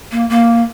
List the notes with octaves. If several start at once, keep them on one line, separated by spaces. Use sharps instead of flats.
A#3
A#3